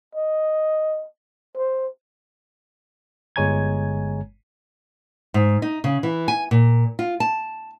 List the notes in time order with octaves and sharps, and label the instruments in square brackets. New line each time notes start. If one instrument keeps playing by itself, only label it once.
[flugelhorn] D#5
C5
[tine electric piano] G1 G#3 C#5 G#5 A#5 G#6
[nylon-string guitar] G#2
D#4
C#3
E3
G#5
A#2
F4
A5